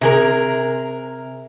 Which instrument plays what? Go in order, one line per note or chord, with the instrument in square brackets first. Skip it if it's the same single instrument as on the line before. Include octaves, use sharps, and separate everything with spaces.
[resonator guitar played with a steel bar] C3 G#4 A#4